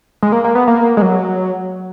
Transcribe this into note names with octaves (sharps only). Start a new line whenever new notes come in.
G#3
A#3
A#3
B3
A#3
G#3
F#3